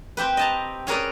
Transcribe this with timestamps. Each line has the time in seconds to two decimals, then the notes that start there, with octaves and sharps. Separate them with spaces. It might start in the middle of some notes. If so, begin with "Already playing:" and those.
0.17 C4 G4 B4
0.37 D#5 A5 A#5
0.87 C#4 G#4 A#4 B4 D5